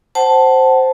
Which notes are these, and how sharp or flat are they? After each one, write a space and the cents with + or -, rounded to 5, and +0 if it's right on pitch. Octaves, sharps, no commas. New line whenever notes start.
C5 +0 F#5 +30 A5 -5